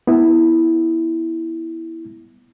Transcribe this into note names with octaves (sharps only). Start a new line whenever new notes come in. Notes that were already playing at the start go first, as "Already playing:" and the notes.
B3 E4